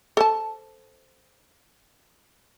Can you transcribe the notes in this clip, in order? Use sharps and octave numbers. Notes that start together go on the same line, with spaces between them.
A4 C5 A5